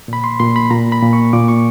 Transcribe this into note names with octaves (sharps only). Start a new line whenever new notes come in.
A#2 B5
C6
A#2 C6
B5
A#2 A#5
B5
A#2
C#6
A#2 D6
C#6